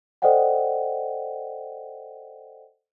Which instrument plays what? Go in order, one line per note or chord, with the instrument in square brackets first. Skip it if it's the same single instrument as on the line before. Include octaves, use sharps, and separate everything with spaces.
[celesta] A4 C5 D5 D#5 F#5 G5